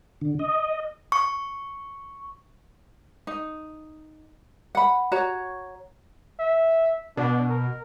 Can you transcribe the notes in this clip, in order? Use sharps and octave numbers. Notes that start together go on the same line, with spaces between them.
D3
D#5
C#6
D#4
F#5 B5
F#4 C#5 A#5
E5
B2 D4
A#4